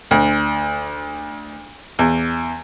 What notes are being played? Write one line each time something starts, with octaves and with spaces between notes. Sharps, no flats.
D2
E2